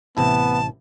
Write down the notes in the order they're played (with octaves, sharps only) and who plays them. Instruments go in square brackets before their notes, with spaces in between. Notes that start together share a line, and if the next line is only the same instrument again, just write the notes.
[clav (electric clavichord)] A1 C3 E4 [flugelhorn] B3 [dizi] A5